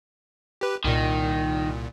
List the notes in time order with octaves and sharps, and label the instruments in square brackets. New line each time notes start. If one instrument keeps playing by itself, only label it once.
[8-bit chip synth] G4 B4
[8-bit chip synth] C2 A#2 [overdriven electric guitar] D#3